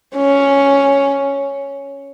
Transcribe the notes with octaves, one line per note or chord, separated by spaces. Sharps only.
C#4